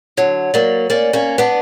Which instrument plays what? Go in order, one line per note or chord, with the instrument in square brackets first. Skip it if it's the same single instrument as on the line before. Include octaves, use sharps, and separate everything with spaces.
[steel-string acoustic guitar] D3 F#3 [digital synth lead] C#5
[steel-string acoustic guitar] F#3 A#3 [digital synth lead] D5
[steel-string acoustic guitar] A#3 C#4 [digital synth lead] D5
[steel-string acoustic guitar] A#3 C#4
B3 D4